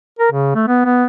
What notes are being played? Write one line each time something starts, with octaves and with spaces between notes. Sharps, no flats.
A#4
C#3
A3
B3
B3